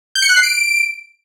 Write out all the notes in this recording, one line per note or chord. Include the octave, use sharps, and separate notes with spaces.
G6
C#7
F#6
C7
D7